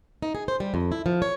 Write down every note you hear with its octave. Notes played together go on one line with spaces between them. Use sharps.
D#4
G#4
C5
G3
F2
E4
F3
C#5